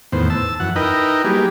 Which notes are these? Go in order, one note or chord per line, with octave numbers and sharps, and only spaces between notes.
E2 A2 D#3 B3 C5
A5 E6
F#2 E3 F#5
D#4 E4 A#4 B4 D#5 G5
F#3 G3 A#3 G4 G#4